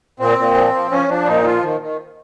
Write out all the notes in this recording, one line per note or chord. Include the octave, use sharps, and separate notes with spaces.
A#2 C4
A#2
F3
F3
F3 C#4
F3 D4
A#2 D#4
F3 F4
D#3
D#3